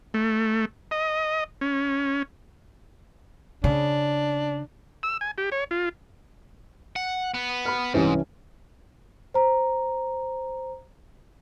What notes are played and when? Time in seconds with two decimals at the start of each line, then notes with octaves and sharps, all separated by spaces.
0.14 A3
0.91 D#5
1.61 C#4
3.64 C#3 D4
5.03 E6
5.21 G#5
5.38 G4
5.52 C#5
5.71 F4
6.96 F#5
7.34 B3
7.65 B5 F6
7.94 C2 G#2 E3 C#4
9.34 C5 A#5